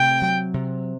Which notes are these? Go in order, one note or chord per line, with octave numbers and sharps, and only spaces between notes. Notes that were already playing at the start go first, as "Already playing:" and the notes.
Already playing: C3 A3 G5
F#3
C3